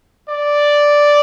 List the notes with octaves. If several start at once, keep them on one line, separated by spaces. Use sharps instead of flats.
D5